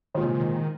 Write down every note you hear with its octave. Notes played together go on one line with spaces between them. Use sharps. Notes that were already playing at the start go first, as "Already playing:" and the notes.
A#2 D#3 G#3 F4 C5
C3
D#3